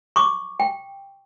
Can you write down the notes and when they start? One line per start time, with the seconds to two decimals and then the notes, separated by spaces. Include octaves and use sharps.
0.16 C#6 D6
0.60 G5